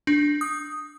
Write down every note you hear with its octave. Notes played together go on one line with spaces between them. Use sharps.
D4
D#6